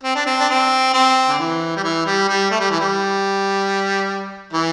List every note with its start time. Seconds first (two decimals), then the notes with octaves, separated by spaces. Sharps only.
0.04 C4
0.15 D4
0.26 C4
0.40 D4
0.49 C4
0.94 C4
1.29 D3
1.39 E3
1.76 G3
1.84 E3
2.06 G3
2.29 G3
2.51 A3
2.60 G3
2.71 E3
2.80 G3
4.53 E3